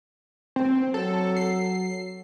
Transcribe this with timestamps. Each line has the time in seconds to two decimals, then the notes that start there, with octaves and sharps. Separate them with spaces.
0.56 C4
0.94 F#3 A4
1.37 C7